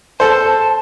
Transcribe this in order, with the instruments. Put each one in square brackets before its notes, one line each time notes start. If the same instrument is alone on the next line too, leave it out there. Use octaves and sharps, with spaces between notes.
[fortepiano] A4 C5 [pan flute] A5